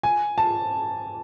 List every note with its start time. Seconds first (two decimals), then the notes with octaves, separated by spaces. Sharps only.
0.03 G#5
0.38 A5